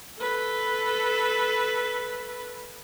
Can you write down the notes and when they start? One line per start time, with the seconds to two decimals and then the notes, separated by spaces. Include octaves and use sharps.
0.19 A4 B4